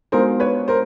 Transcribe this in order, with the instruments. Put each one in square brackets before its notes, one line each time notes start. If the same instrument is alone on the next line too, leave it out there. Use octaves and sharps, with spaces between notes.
[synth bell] G#3 B3 D#4 F#4 [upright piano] A#4 C5
[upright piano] B4 C#5
A#4 C5